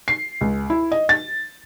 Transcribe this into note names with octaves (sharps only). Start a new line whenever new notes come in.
C7
C#2
E4
D#5
A6